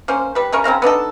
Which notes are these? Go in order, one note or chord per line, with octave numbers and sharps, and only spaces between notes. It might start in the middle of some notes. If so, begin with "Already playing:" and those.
A#3 C#4 C5
G3 B4
C#3 C#4 A#4 C#6
C#3 C4 F5 A#5
B3 D4 D#4 A4